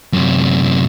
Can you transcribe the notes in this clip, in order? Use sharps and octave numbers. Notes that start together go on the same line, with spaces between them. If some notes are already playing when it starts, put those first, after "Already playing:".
F#2 C3